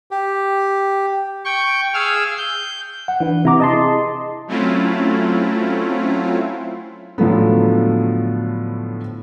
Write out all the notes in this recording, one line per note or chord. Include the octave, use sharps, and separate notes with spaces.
G4
G5 C#6
G#4 F5 E6 F6
G6
F#5
E3 D4 B4
C3 E4 A#5 D6
D#5 A5 C6
G#4
F#3 A3 C4 C#4 E4 F4
A2 D3 F3 F#3 A3 B3